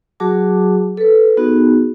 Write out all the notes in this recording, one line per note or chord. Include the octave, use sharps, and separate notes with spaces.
F#3 F#4 G#4 A5 D6
A4 B4
B3 D#4 F#4 G#4